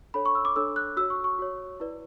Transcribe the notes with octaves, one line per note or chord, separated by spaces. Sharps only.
D4 A4 C#5 B5
C#6
E6
D6
D4 A4 C#5 E6
F#6
F#4 C#5 E6
C#6
C#6
F#4 C#5
E4 B4 D5